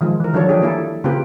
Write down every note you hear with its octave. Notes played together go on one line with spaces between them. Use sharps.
D#3 F3 G#3
E3 A#4
D#3 F3 F#3 D4 A4 C#5
F3 D4 G4 G#4
A#3 E4 A4
C#3 A#3 C4 F4 G4 B4